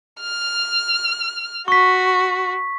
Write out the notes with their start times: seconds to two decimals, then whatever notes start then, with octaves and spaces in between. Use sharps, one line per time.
0.21 F6
1.68 F#4 C#6 B6